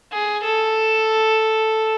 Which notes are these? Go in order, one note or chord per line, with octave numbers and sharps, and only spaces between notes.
G#4
A4